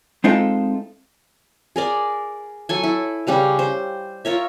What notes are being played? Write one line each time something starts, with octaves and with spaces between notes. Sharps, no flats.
G#3 C4 D#4 F4 A4 E5
G#4 A#4 D5
F#3 A4 G#5
E4
C#3 G3 B4 F5
C5
F4 A#4 C#5 E5